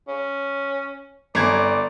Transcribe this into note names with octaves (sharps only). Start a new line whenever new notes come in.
C#4
G1 D5 G#6